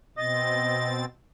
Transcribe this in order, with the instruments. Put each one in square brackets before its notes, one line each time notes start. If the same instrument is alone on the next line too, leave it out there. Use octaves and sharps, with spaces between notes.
[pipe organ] B2 C4 A6 [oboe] D#5